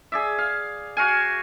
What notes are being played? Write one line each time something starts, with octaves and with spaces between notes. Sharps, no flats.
G#4 D5 E5
F5
F#4 F5 G#5